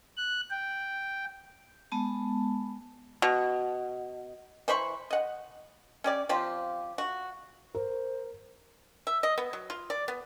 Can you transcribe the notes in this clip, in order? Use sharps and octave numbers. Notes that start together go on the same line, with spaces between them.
F#6
G5
G#3 B3 A5
B2
E3 C5 B5 C#6
D#5 F#5
C#4 G4 D5
F3 C4 F4 G4
F#4
A#4 C5
E5
D#5
B3
F#3
F4
D5
B3